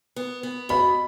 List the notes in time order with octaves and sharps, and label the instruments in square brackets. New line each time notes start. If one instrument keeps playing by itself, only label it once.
[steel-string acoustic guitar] B3
B3
[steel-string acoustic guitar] B2 [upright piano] B5